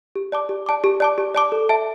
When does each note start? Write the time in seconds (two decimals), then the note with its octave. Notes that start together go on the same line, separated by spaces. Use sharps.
0.15 G4
0.32 D5 A5 D6
0.49 G4
0.66 D5 A5 D6
0.84 G4
1.00 D5 A5 D6
1.18 G4
1.35 D5 A5 D6
1.52 A4
1.69 E5 A5